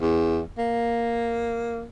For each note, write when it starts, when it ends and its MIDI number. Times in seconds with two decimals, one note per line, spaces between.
0.01 0.42 40
0.58 1.84 58